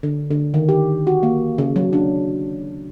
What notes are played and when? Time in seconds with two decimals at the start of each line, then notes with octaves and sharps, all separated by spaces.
0.03 D3
0.31 D3
0.54 D#3
0.69 G4
1.07 F#4
1.23 A#3
1.58 C#3
1.76 F#3
1.93 D4